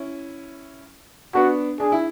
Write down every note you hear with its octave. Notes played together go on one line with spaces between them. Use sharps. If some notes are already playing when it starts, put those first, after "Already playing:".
Already playing: C#4 E4
B3 D4 F#4
D4 G#4
E4